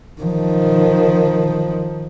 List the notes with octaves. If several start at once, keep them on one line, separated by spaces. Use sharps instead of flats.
D#3 F3